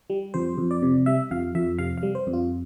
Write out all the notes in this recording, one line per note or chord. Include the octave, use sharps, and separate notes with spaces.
G3
F2 C5
F2
D5
C3
G3 E5
F2 F5
F2 E5
C3 F5
F5
G3
C5
F2
F4